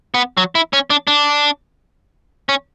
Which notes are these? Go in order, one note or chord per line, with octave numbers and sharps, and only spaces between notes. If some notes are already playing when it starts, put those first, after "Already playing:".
B3
F#3
E4
C#4
D4
D4
C#4